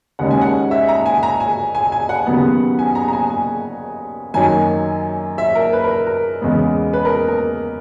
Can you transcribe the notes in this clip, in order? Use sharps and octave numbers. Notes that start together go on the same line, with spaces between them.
D#2 C#3 G#3 C#4 F#5
G#5
F#5
E5
A#5
G#5
A#5
G#5
G#5
G#5
F#5
D#2 C#3 F#3 B3
G#5
A#5
A#5
G#5
G#5
F#2 D#3 F#3 A#3 G#5
E5
A#4
B4
A#4
A#4
E2 C#3 G#3 B3
B4
A#4
A#4